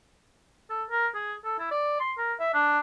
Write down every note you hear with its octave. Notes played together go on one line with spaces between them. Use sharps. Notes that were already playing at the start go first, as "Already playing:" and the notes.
A4
A#4
G#4
A4
E4
D5
C6
A#4
E5
D4